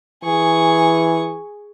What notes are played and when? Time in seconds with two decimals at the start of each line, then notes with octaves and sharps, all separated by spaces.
0.24 E3 G#4 C#6